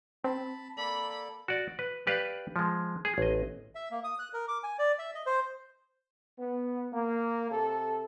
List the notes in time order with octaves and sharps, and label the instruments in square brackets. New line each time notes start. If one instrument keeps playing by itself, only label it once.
[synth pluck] C4 [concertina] A5 B5
[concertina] A#3 A4 D5 [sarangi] B5
[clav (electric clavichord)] F#4 D5
B4
G4 B4 D5 F5
F3 G#3
G#4
A1 D#5
[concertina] E5
A#3
D#6
F#6
A#4
D6
G#5
D5
E5
D#5
C5
[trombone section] B3
A#3
C3 A4